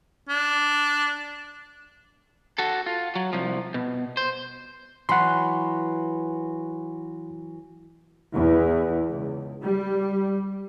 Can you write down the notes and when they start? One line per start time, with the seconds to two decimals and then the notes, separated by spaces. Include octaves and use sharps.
0.29 D4
2.58 F#4 A4
2.86 F4
3.15 F#3
3.33 C2 F3
3.74 B2
4.17 C5
5.09 E3 F#3 F#5 B5 C6
8.33 E2
9.09 C#2
9.63 G3